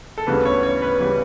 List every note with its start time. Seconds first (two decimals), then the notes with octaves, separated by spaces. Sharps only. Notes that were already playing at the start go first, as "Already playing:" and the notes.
0.18 A4
0.27 D2 C#3 E3 G3 B3 B4
0.45 C#5
0.63 C#5
0.82 B4
1.00 C#3 E3 G3 B3